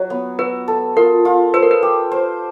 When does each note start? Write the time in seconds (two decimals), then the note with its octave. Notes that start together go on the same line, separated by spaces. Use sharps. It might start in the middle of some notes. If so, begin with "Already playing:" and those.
Already playing: F#3 C#5
0.10 B3
0.39 F#4 B4
0.68 A4
0.97 F4 A#4
1.25 F4
1.54 B4 C5
1.63 A#4
1.71 B4
1.83 G4
2.12 C5